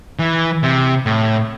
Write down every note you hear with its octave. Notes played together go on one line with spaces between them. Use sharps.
E3
C3
A2